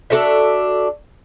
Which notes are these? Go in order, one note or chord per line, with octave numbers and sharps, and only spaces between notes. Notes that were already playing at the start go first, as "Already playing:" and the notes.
D4 F#4 A4 E5